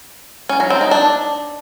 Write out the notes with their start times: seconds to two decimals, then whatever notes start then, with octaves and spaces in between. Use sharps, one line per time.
0.49 C#4
0.60 F#3
0.70 C4
0.81 D#4
0.91 D4